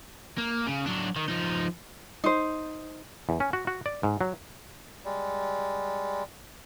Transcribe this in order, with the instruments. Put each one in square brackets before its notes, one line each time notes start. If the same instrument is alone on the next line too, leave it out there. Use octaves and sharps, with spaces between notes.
[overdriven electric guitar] A#3
C#3
F#3 D4
D#3
F3 D#4
[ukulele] D#4 C5
[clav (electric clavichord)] E2
C#4
F#4
F#4
D5
G#2
F#3
[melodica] G3 G#3